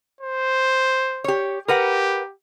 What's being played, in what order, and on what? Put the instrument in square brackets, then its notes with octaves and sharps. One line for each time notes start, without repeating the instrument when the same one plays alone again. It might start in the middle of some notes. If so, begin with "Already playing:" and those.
[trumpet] C5
[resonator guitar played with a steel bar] G4 C#5
[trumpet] G4 [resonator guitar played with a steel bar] A#4 B4 F#5